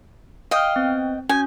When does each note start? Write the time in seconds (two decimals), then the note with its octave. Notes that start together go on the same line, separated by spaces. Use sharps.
0.51 D#5 F5 G5 D#6 F6
0.76 B3 C4
1.29 C#4 F#4 G#5 G6